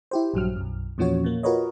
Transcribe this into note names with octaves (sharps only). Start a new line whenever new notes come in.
E4 G4 C5
A#1 G2 F#3 F6
B1 F#2
E2 A#2 F3 C#4 F#4 C#5
A#2 A#3
F4 F#4 A#4 B4 C#5 D#5